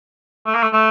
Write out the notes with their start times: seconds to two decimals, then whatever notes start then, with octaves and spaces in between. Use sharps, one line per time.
0.46 A3
0.54 A#3
0.63 A3
0.73 A3